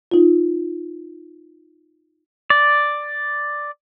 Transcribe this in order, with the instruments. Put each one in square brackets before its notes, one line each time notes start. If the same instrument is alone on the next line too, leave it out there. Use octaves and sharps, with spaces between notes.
[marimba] D#4 F4
[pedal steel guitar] D5